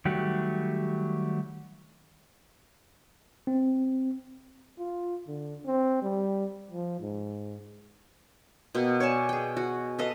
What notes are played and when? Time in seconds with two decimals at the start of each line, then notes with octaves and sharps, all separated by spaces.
0.05 D#3 F#3 G3 A3 F#4 G4
3.47 C4
4.79 F4
5.28 D3
5.66 C4
6.03 G3
6.71 F3
7.01 G#2
8.75 B2 A#3 G5
9.00 C#5 D5 G#5 A5
9.29 G#4 G5
9.57 F#4
9.99 A4 B4 D#5 F5